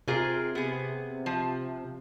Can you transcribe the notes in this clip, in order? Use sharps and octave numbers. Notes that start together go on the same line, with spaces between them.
C3 F4 G#4 A#4
B3 G#4
F3